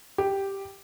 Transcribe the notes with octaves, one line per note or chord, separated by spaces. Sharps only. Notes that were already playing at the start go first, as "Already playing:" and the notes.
G4